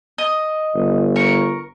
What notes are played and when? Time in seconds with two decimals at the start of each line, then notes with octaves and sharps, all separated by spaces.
0.18 D#5
0.74 G1
1.16 A#4 C#6